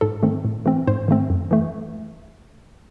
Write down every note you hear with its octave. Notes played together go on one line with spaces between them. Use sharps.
G#2 A4
D#3 A3 C4
A2
E3 A3 C4
G#2 C5
D#3 A3 C4
F#2
E3 A3